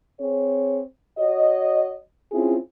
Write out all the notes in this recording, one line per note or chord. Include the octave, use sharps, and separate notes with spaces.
C4 G#4 C#5
F#4 C#5 D#5
C4 C#4 E4 F4 G#4